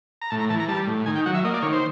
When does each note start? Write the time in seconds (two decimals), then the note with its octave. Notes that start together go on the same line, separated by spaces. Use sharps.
0.22 A#5
0.30 A2 A5
0.40 A#5
0.50 E3 A5
0.60 A#5
0.68 G3 A5
0.87 A2
1.06 D#3 G#5
1.15 G5
1.26 F#3 F#5
1.35 E5
1.44 A#3 D#5
1.54 D5
1.62 D#3 C#5
1.72 C5